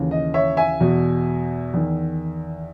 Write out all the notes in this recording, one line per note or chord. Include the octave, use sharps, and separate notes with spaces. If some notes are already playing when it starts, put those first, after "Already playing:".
Already playing: D#2 C#3 E3
D#5
C#5 E5
E5 G#5
E2 B2
E2 D#3